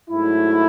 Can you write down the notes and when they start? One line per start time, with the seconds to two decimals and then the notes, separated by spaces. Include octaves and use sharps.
0.10 G#2 F#3 A3 E4